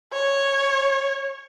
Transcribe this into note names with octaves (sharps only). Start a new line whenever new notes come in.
C#5